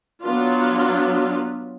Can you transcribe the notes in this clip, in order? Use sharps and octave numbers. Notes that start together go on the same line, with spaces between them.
F#3 B3 D4 F4